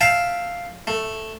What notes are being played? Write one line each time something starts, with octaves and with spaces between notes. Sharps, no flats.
E5 F5 G5 A5
A3